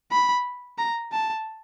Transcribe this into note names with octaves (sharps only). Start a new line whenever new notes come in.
B5
A#5
A5